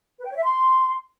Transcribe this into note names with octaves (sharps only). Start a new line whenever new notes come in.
B4
G5
C#5
E5
C6